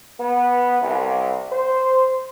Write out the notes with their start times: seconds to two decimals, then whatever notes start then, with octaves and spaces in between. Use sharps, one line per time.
0.19 B3
0.81 C2
1.52 C5